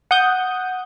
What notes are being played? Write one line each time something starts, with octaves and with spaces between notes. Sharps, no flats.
F#5 D#6 G6